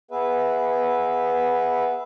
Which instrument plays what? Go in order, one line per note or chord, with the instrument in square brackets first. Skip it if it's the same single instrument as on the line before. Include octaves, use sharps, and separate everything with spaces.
[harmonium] B3 G#4 B4 E5